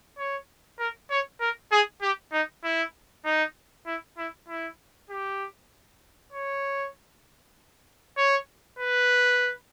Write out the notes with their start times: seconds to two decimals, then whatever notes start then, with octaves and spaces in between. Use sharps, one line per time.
0.18 C#5
0.79 A#4
1.10 C#5
1.40 A#4
1.72 G#4
2.02 G4
2.33 D#4
2.64 E4
3.25 D#4
3.86 E4
4.18 E4
4.49 E4
5.10 G4
6.33 C#5
8.18 C#5
8.79 B4